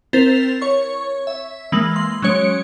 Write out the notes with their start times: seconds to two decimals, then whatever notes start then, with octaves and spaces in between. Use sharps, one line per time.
0.13 C4 E4 A#4 C5 A6 F7
0.62 C#5 C#6
1.27 E5
1.72 E3 G#3 A#3 F#7
1.96 C6
2.22 F#3 G#3 C#4 C#5 C#7 D7